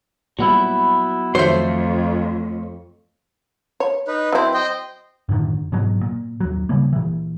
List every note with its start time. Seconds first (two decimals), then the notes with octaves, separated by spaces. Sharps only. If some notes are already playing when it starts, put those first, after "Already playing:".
0.39 A#2 F#3 G3 B3 E4
1.35 F2 D#3 F#3 A3 C5 C#5
3.80 C#5
4.08 D#4 B4
4.32 F#3 C4 E4
4.54 C5 D#5 G5
5.29 F#2 A2 D3 D#3
5.72 G#2 B2 F#3
6.01 A#2
6.40 D#2 F#3
6.69 C#3 G3 A#3
6.93 A#2 E3